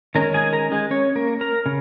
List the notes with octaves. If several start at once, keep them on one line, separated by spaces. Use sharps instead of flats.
D#3 G#3 C#4 A#4 A#5
G#4 G#5
A#4 A#5
G#3 G#4
C#4 C#5
A#3 A#4
A#4 A#5
C#3